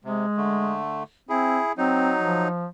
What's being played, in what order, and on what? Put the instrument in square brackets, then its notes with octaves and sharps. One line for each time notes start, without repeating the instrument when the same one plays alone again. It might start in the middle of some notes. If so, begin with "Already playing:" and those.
[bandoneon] C3 [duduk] G#3
[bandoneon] D3 A3
[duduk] C4 [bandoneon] E4 G#4
[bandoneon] F#3 D#4 [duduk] C4
[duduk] F3